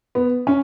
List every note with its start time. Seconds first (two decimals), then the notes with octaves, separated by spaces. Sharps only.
0.15 B3
0.47 C#4